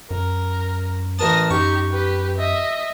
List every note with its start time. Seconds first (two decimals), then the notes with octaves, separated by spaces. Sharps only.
0.11 F#2 A#4
1.19 A1 A#4 A5 D#6 A#6
1.50 F#2 D#4 G4 C#6
1.91 G4 B4
2.38 D#5 E5